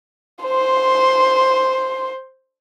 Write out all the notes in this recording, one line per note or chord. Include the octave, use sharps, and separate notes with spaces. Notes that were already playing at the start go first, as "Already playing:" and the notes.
C5 C6